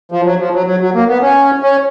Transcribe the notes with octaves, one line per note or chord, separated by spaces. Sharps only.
F3
F#3
F3
F#3
F#3
F#3
A#3
B3
C#4
C#4